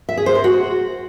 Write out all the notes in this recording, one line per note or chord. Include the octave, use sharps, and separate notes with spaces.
E5
G#4
C5
A#4
F#4